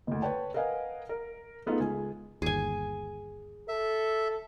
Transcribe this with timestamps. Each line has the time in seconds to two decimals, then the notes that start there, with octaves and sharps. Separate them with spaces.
0.07 F#1 D2
0.22 B4 C#5 G5 A5
0.54 A#4 B4 D#5 F5 F#5 G#5
1.09 A#4
1.66 A3 B3 D#4 F4 G#4 A4
1.79 C#2 G#4 G#5
2.42 G1 D#2 G#4 G#5
3.68 A4 E5